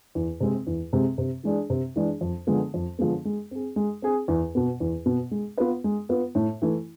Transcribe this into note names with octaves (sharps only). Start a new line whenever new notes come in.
E2
C3 G#3 C4
E2
C3 G#3 C4
C3
E3 G#3 D4 G#4
C3
E3 G#3 D4 G#4
F2
D3 F3 G#3 B3
F2
D3 F3 G#3 B3
G#3
C4 G#4
G#3
C4 G#4
E2
B2 B3
E2
B2 B3
G#3
B3 F4 B4
G#3
B3 F4 B4
A2
E3 A3 E4